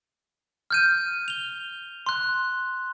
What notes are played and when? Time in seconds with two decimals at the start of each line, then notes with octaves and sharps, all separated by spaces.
0.71 F6 G6 D#7
1.28 F7 G7
2.06 C6 F#6